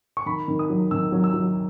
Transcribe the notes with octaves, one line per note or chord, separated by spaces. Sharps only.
C#6
D#3 B5
D#3
D#6
F#3
D#3 E6
F#3
E6
F#3